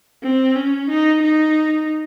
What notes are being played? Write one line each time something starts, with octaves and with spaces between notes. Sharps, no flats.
C4
C#4
D#4
D#4